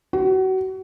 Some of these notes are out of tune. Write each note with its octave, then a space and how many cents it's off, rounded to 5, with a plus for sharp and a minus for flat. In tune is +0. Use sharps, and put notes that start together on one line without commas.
F#4 +30